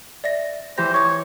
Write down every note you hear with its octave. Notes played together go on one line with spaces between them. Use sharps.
D5 E5 A#6
E3 G4 B4 C5 A#6
C#5 C#6 D6